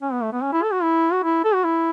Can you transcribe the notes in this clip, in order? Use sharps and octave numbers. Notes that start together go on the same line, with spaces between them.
C#4
B3
A3
B3
C#4
E4
A4
F#4
E4
F#4
E4
A4
F#4
E4